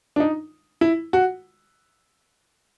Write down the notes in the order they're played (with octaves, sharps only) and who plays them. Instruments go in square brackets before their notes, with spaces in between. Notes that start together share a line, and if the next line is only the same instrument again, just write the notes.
[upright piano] D4
D#4
E4
F#4